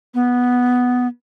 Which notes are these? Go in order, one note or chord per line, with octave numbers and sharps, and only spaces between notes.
B3